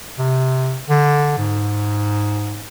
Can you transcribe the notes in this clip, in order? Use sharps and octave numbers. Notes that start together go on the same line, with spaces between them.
C3
D3
G#2